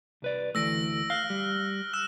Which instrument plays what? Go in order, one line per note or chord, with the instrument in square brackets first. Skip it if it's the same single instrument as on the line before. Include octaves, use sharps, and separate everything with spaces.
[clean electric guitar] C2 B4 D5
[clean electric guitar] D2 E3 A3 [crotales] E6 A#6 D7
[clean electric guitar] F5 [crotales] F6 F#6
[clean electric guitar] G3
[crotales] E6 F#6 E7